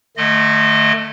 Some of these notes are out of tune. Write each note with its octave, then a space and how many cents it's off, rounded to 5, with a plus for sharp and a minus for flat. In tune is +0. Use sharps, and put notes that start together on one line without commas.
D3 +40 A3 +0 D#5 -20